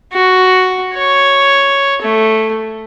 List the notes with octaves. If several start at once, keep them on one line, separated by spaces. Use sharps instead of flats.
F#4
C#5
A3